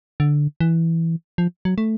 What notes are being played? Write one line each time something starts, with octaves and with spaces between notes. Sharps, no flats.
D3
E3
F3
F#3
A3